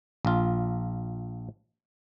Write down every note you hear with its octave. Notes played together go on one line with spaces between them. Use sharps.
A#1 F4